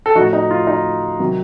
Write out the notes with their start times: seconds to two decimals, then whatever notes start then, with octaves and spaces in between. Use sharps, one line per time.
0.06 A4
0.15 F3 D#4 F#4
0.20 A2
0.33 D#4
0.51 F4
0.67 D#4
1.19 C3 D#3 F#3